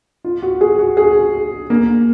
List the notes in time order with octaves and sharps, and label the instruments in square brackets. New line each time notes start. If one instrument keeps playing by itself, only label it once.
[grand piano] F4
F#4
G#4
F#4
G#4
A#3